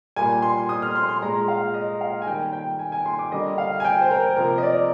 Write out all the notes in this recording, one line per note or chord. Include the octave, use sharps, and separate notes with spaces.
A#2 G3 A#3 G#5
C6
D#6
F6
C6
C6
A#2 G#3 A#5
F5
D#5
F5
G#5
D#3 G3 A#3 G5
G5
G#5
G#5
C6
D6
D3 G3 A#3 D#5
F5
G#5
G5
C5
A#4
C3 F3 A#3 A#4
D#5
D5